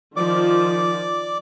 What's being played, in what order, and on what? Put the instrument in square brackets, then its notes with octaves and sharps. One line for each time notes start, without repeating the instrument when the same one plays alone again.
[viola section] D#3 F3 [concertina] D5 D6